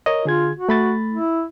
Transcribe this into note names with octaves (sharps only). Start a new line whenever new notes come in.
A#4 C#5 D#5
D3 F4 G#4 G#6
F#4
A3 B5 A6
E4